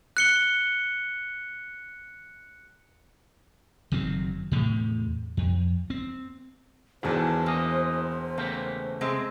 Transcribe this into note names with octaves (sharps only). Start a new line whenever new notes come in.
F#6 C#7 G7
F#1 D#3 F#3 C4
E2 A2 C3
F2
C4
E1 E2 D3 D#3 D4 G#4 C5
E3 A#3 D#5
C#3 A3 A#3 G4
C3 G#3 C4